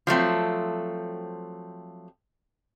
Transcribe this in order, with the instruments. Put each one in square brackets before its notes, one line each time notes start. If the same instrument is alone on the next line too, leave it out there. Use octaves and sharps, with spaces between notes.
[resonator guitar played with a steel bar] F3 F#3 A3 C4